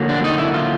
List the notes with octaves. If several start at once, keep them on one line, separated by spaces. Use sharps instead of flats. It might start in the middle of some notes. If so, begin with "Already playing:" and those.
Already playing: D3 F#3 A#3
D4
D#4
E4
F4